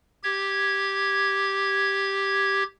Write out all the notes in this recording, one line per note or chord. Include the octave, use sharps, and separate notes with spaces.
G4 G#6